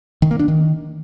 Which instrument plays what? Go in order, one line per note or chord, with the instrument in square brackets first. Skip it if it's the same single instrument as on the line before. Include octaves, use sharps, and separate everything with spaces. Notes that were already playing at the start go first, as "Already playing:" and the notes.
[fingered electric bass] D#3
A#3
D4
D#3